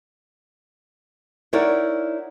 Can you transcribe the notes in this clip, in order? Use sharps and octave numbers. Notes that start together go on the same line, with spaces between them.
D#4 E4 A#4 C#5 D5 F#5